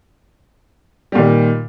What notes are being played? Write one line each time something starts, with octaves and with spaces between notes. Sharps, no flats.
A#2 D#3 G3